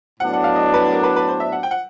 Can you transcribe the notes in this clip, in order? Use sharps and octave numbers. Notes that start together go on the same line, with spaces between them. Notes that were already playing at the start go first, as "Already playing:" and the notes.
A2 F#3 B3 D4 F#5
F#5
F5
D#5
B4
A#4
B4
B4
C5
E5
F#5
G5
F#5